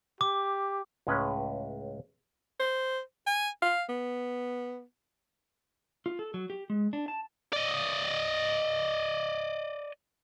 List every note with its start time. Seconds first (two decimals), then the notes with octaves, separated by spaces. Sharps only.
0.21 G4 D6
1.07 C#2 A2 G#3 C#4 B4
2.60 C5
3.26 G#5
3.62 F5
3.89 B3
6.06 F4
6.19 A4
6.34 F#3
6.50 G4
6.70 G#3
6.93 D4
7.08 A5
7.53 D5 D#5